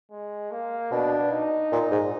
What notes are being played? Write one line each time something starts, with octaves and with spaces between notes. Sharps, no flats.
G#3
A#3
B2 D4
D#4
A#2
G#2